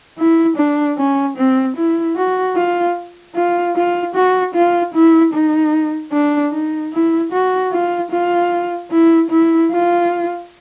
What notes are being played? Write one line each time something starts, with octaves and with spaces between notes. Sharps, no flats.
E4
D4
C#4
C4
E4
F#4
F4
F4
F4
F#4
F4
E4
D#4
D4
D#4
E4
F#4
F4
F4
E4
E4
F4